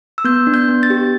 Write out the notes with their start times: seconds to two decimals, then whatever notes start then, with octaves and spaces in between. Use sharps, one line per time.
0.18 E6
0.24 B3 G6
0.47 D4
0.54 G6
0.68 B3
0.83 A6
0.90 G4